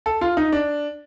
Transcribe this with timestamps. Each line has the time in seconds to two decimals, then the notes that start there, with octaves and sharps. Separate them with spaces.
0.06 A4
0.21 F4
0.37 D#4
0.52 D4